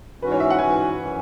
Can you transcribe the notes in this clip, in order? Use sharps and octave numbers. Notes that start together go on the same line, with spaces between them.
G#2 E3 C#4 F#4 B4
C#5
E5
F#5
G#2 E3 C#4 F#4 G#5
F#2 E3 C#4